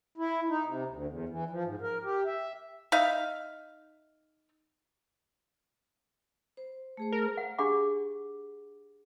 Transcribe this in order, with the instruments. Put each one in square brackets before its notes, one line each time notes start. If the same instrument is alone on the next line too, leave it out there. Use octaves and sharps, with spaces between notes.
[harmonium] E4
D#4
C3
D2
E2
E3
F3
G#2
A#4
G4
E5
[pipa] D#4 E5 F5
[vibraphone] C5
A3 G#4 C5
[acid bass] A#4
[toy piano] F#5
D4 G4 G#4 F#5 B5 D6